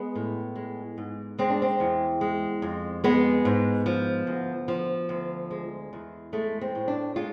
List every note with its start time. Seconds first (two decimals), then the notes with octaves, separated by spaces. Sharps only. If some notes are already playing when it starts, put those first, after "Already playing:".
Already playing: G#3 B3
0.15 A2
0.56 G#3
0.98 G#2
1.39 G#3 C4
1.50 D4
1.62 C4
1.80 E2
2.21 G#3
2.62 F2
3.04 G#3 B3
3.45 G#2
3.86 F3
4.27 D2
4.68 F3
5.09 D2
5.51 G#3
5.93 E2
6.33 G#3 A3
6.61 C4
6.75 A2
6.88 D4
7.16 G#3 F4